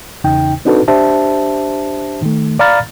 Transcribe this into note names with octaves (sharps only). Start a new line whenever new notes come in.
E2 C#3 D#4 G5
C4 D4 D#4 F#4 A4 B4
D4 G4 C5 E5 A5
D#3 A3
D5 F5 A#5 B5 F6 A6